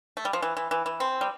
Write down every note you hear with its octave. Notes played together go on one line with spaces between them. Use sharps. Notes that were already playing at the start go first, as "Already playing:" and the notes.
A3
G3
F3
E3
E3
E3
E3
C4
G3